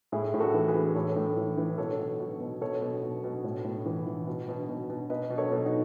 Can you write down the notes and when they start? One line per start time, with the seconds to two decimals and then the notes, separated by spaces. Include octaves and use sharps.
0.12 A2 E4 G#4
0.34 A2
0.40 F#4 A4
0.54 E3
0.68 G#4 B4
0.74 E3
0.95 A2 A4 C#5
1.16 A2
1.37 E3
1.58 E3
1.78 B2 A4 C#5
1.99 B2
2.20 B2
2.40 B2
2.61 B2 A4 C#5
2.82 B2
3.03 B2
3.24 B2
3.44 A2
3.64 A2
3.86 E3
4.07 E3
4.27 B2
4.49 B2
4.69 B2
4.90 B2
5.10 B2 B4 D#5
5.30 B2
5.38 A4 C#5
5.52 B2
5.66 D#4 F#4